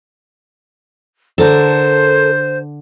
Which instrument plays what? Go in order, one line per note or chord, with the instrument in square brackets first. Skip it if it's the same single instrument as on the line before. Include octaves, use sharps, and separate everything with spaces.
[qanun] D3 A5 [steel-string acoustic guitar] A4 A#4 [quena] C5